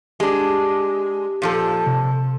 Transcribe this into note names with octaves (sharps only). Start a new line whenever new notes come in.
G#3 D4 G4
A#2 F3 A4
C3